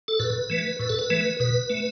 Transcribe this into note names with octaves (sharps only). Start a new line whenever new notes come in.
A4
A2 B4
E3 A3
A2 B4
A4
B4
E3 A3
B2 B4
A3